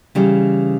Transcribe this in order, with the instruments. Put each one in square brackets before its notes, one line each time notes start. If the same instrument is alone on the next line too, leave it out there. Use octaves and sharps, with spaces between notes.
[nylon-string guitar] C#3 E3 G3